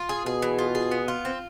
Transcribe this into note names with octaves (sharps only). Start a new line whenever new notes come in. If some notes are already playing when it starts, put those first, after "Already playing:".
Already playing: F4
G#4
B2 G#4
E3
F4
G#4
B3
F4
C4